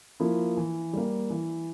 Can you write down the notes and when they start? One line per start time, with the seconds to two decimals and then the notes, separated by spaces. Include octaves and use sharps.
0.20 F3 A#3 E4
0.57 E3
0.93 G3 A#3
1.30 E3